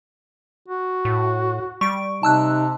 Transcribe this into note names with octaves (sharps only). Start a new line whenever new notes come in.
F#4
A2
G3 C#6 D7
C3 D#4 A5 E6 F#6